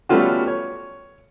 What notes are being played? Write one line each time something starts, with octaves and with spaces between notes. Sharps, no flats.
G3 A3 B3 C#4 F4 F#4
C#5